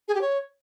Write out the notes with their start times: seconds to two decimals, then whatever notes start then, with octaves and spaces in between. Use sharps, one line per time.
0.08 G#4
0.15 G4
0.21 C#5